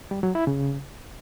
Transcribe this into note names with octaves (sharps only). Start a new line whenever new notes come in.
G3
F#3
E4
C#3